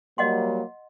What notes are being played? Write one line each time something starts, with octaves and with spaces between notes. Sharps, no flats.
F#3 G3 A#3 D#5 F#5 C6